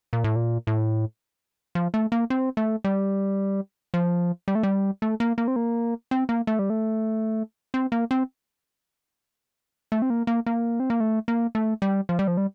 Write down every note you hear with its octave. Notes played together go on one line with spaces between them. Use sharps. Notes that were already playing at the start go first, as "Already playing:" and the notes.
A#2
A2
A#2
A2
F3
A3
A#3
C4
A3
G3
F3
G3
A3
G3
A3
A#3
A#3
C4
A#3
C4
A#3
A3
G3
A3
C4
A#3
C4
A3
C4
A#3
A#3
A#3
C4
A#3
A3
A#3
A3
G3
F3
G3
F3
G3